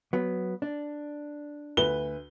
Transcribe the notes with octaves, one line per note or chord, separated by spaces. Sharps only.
F#3 B3
D4
D2 B4 G7